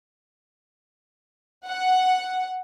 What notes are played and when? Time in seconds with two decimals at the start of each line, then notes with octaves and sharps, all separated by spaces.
1.67 F#5